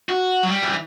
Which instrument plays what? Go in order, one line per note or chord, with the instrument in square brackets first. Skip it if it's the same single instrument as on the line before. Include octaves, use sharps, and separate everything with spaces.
[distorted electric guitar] F#4
F#3
G3
E3